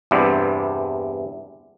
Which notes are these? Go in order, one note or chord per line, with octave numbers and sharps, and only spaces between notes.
E2 G2 C3